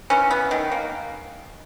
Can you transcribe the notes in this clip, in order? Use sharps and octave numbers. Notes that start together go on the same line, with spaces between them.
E3 C#4
B3
D#3
A#3